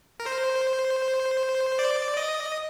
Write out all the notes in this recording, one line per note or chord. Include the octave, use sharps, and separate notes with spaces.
A#4
C5
D5
D#5